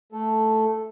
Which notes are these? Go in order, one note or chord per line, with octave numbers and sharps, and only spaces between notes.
A3 A4